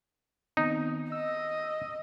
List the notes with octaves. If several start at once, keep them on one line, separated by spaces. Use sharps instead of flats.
D#3 B3 C4 D#4
D#5 E6